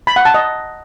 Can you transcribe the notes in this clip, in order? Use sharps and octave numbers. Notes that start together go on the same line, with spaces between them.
B5
F#5
A5
D#5